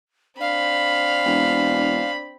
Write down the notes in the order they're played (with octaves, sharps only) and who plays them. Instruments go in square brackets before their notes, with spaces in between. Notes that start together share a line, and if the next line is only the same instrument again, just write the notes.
[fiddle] C4 B5 [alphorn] D4 [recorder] F5
[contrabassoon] E1